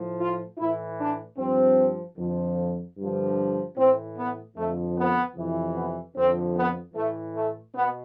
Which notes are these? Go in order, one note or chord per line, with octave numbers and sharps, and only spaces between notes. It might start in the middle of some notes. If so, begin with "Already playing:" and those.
Already playing: A2 F3
F4
A2 E3 E4
D4
G2 F3 C4
F2 D3 F3
G2 D3 F3
A2 E3 C4
B3
F2 D3 F3 A3
B3
F2 C3 E3
B3
F2 D3 F3 C4
B3
A2 E3 A3
A3
B2 B3